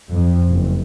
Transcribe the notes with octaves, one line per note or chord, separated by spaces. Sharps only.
F2
F#1